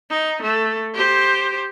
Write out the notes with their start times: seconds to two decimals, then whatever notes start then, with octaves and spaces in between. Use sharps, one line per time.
0.10 D#4
0.42 A3
0.94 G4 C5